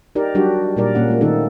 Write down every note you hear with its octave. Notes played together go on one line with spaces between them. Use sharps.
D#4 G4 A#4 D5
F#3 G3 D4 F#4 G4
A#2 G3 A#4 D5
A#2 A#3 C#4 F#5
G#3 A#3
D#3 A3 A#3 C4 D#4 A4